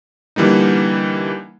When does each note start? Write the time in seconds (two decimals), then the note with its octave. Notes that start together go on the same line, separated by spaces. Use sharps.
0.36 D3 E3 G3 A#3 D#4